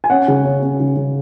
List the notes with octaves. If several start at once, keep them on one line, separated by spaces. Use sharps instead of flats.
G#5
C#4 F#5
C#3
C#4
C#4
C#3
C#3